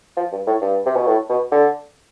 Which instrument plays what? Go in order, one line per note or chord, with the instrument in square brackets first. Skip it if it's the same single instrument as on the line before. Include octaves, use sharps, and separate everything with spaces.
[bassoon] F3
G2
A2
G2
C3
B2
A2
B2
D3